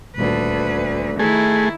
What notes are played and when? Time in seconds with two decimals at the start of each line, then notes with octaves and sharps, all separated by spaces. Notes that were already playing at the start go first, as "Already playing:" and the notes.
0.16 D#1 D2 B4
1.19 D#3 A3 E4 G#4